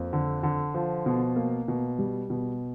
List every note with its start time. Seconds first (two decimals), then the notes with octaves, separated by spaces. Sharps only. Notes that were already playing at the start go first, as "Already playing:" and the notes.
Already playing: F2 A#3
0.13 D3
0.43 D3
0.74 F3
1.06 B2
1.36 A#3
1.68 B2
1.99 G3
2.30 B2